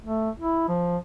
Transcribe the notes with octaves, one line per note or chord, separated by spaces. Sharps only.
A3
E4
F3